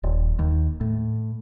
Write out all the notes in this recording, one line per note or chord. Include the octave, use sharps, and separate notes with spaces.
D#1
D#2
A2